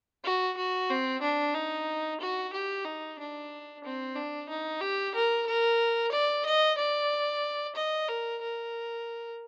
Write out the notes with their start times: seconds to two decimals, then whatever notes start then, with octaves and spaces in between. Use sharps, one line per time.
0.24 F#4
0.57 F#4
0.90 C4
1.21 D4
1.54 D#4
2.20 F#4
2.53 G4
2.85 D#4
3.19 D4
3.84 C4
4.16 D4
4.49 D#4
4.81 G4
5.15 A#4
5.46 A#4
6.12 D5
6.46 D#5
6.78 D5
7.75 D#5
8.08 A#4
8.42 A#4